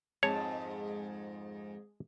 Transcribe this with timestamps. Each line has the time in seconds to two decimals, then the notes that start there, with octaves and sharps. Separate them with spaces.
0.23 F2 G#2 G#3 G#4 C#5 A5